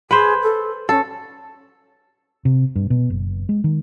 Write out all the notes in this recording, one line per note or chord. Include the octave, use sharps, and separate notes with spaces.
G#4 B4 C5
A4
C#4 A4
C3
G2
B2
F#1
G#3
D#3